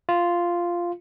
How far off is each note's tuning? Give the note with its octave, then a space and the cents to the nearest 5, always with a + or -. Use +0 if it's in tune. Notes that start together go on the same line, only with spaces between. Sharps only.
F4 -5